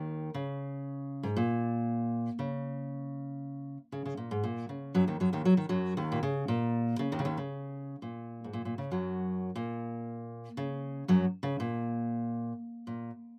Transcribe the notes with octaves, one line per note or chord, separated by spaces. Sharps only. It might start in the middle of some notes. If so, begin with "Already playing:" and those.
Already playing: D#2 D#3
C#3
G#2
A#2
C#3
C#3
C#3
A#2
G#2
A#2
C#3
F#2 F#3
D#2 D#3
F#2 F#3
D#2 D#3
F#3
D#3
F#2 F#3
D#2 D#3
A#2
C#3
A#2
C#3
D#2 D#3
C#3
D#2 D#3
C#3
A#2
G#2
A#2
A#2
C#3
F#2 F#3
A#2
C#3
F#2 F#3
C#3
A#2
A#2